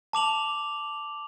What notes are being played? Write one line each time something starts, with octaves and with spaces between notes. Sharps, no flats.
A5 D6 F7 F#7